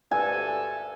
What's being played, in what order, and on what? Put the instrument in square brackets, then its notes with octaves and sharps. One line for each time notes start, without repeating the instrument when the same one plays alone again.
[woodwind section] D2 G2 A4 [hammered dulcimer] G#5